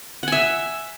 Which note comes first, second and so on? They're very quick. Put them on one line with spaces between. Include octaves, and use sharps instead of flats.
F#5 G#5 E5